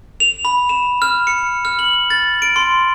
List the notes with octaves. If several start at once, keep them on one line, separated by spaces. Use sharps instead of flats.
F7
B5
E7
F6
C#7
F6
F#7
A6
D7
C6